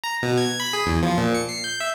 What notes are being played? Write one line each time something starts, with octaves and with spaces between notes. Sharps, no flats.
A#5
B2
G#6
B5
G#4
E2
F3
A#2
C#7
C7
G6
E5